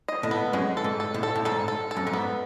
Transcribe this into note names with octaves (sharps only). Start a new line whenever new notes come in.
D#5
A2
B3
F#2 G#3
A4
G#2
A4
A2
A4
A2
G#2 A4
A4
A4
F#2
G#2
B3